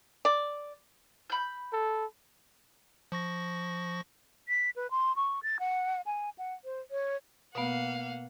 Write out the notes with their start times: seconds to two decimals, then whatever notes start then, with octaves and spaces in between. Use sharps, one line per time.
0.25 D5
1.30 B5 G6
1.73 A4
3.12 F3 C#6 A#6
4.48 B6
4.76 B4
4.91 C6
5.16 C#6
5.43 A6
5.60 F#5
6.06 G#5
6.38 F#5
6.64 C5
6.91 C#5
7.55 B2 A#3 B3 F5 F#5